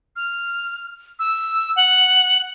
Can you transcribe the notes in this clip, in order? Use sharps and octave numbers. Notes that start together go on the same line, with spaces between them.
F6
E6
F#5